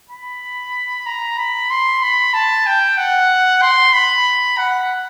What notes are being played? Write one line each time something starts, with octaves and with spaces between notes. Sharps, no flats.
B5
A#5
B5
C6
B5
A5
G5
F#5
C6
B5
F#5